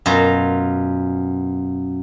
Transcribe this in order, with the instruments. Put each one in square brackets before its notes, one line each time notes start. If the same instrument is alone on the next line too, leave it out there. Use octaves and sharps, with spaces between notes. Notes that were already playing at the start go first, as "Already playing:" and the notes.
[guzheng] F#2 B2 F4 A#5